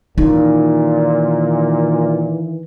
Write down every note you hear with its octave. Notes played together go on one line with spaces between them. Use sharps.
A#2 D#3 E3 C#4 D#4